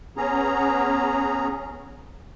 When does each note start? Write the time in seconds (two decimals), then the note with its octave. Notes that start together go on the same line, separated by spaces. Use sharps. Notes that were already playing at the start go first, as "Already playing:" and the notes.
0.17 B3 C#4 G#4 A#5